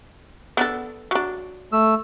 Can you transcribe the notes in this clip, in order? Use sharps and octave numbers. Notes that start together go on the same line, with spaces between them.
B3 D4 A4
F#3 D4
A3 E6